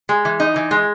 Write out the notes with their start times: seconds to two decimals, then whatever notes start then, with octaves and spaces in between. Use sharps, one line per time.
0.09 G#3
0.25 E3
0.40 D#4
0.56 E3
0.71 G#3